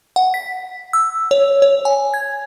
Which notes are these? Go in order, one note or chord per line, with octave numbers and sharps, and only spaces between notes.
F#5
B6
E6
C#5
C#5
G#5
G#6